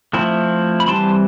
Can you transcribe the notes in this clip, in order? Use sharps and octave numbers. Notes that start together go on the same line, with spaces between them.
F3 A3 C4 E4
B5
E3 G3 C4 A5 C6